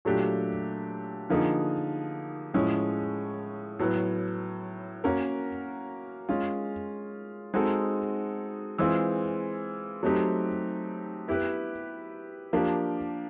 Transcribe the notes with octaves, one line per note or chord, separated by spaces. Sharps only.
A#2 F#3 A3 D4 G4
D3 F3 A#3 D#4 G#4
A2 F3 G#3 C#4
A2 F#3 B3
A#3 C#4 F#4 A#4
G#3 C#4 F4
G#3 C4 D#4 F#4 A4
E3 G#3 C4 F4
F#3 A3 C4 D#4 G4
B3 E4 G4 B4
F3 A#3 D4 G4